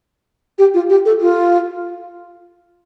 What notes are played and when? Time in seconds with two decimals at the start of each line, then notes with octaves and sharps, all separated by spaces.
0.59 G4
0.74 F4
0.90 G4
1.05 A4
1.20 F4